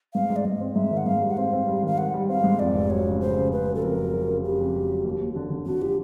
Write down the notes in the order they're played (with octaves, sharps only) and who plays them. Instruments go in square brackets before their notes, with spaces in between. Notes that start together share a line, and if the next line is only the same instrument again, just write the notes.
[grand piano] G#2 [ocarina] F5
[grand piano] G#2
[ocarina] D5
[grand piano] G#2 [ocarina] D#5
[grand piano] C4
[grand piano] G#2 [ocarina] E5
[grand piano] D#3
[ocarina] F#5
[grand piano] G#2 [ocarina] F5
[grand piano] G3
[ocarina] F#5
[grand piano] C4 [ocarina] F5
[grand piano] C4
G3
[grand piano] D#3 [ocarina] F5
[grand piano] D#3 [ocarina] F#5
[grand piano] G3
[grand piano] C4 [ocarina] F5
[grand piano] G#2
[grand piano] F2 [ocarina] D5
[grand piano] F1
[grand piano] F#3 [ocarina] C#5
[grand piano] C#3
[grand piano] C#3 [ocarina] C5
[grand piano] C#3
[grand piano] C#3 [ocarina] B4
[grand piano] F#3
[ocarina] A4
[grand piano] F2 [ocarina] A#4
[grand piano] F#3
F#3
C#3
[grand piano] C#3 [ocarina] G4
[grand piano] F2
F#3
F#3
D#2
D#2
D3
D3
[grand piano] D3 [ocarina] F#4
[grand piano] F3 [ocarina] G4